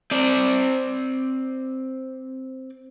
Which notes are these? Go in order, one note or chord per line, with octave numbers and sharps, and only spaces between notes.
C4 D5